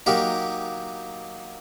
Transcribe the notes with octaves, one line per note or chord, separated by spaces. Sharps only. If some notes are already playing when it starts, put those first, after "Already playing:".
F#3 A#3 D#4 G4 A#4